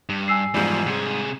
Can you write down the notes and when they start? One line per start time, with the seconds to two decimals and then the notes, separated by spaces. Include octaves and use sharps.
0.09 G2
0.28 G#5 E6 C7
0.54 E2 G#2 F3 G3
0.87 C3 G#4